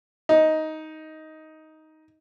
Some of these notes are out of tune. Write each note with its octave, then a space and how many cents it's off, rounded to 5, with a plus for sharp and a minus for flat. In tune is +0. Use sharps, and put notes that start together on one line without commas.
D#4 +10